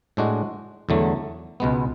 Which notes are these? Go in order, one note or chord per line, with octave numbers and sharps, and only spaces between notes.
A2 G#3 D4 F#4
E2 D3 F#3 A3
C#2 B2 G#3 B3